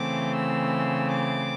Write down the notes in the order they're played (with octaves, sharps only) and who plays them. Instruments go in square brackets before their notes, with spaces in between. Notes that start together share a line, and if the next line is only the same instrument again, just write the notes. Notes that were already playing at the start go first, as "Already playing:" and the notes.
Already playing: [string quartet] C#3 E3 A3 C4 D6
E6
D6